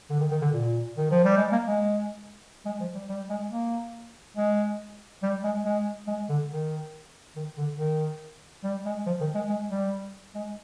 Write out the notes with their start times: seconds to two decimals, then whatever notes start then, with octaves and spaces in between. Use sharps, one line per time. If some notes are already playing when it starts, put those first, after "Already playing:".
0.10 D3
0.20 D#3
0.31 D#3
0.42 D3
0.53 A#2
0.98 D#3
1.11 F3
1.24 G3
1.38 G#3
1.52 A#3
1.67 G#3
2.66 G#3
2.80 F3
2.95 G3
3.09 G3
3.30 G#3
3.51 A#3
4.37 G#3
5.23 G3
5.44 G#3
5.65 G#3
6.08 G#3
6.29 D3
6.50 D#3
7.36 D#3
7.58 D3
7.79 D#3
8.64 G3
8.86 G#3
9.07 F3
9.21 D#3
9.35 G#3
9.49 G#3
9.71 G3
10.35 G#3